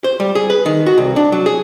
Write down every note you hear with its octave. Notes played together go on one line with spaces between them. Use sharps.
C5
G3
G#4
B4
D#3
F#4
C2
D4
F#3
G#4